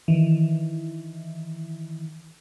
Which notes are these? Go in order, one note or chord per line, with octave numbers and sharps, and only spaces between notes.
D#3 E3